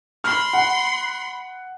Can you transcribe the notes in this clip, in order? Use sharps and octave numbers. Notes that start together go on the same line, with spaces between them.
B5 C6 F6
F#5